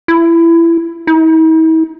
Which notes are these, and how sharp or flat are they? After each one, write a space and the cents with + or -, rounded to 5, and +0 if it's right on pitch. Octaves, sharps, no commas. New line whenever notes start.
E4 +25
E4 -45